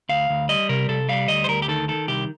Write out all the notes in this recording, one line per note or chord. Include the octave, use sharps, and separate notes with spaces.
D2 F5
D2
G3 D#5
C3 A#4
C3 A4
G3 F5
D2 D#5
C5
D2 A#4
G4
D#3 A4
D#3 A4
C2 G4